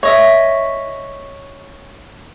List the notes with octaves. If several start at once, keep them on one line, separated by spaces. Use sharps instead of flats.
C#5 D#5 E5